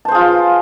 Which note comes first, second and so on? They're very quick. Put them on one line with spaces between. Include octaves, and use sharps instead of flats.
A5 C5 G#4 F4